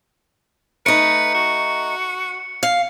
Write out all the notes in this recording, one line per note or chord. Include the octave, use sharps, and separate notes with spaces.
A3 D#4 B4 C#7
F#4
F5